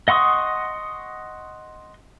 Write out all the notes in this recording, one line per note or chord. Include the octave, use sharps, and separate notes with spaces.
D#5 F#5 C6 C#6 D#6